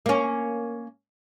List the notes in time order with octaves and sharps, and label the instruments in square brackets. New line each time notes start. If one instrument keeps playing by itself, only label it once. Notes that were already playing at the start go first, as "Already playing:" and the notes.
[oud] A#3 C#4